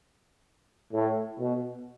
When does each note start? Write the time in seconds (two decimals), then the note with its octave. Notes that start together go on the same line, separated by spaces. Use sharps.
0.93 A2
1.39 B2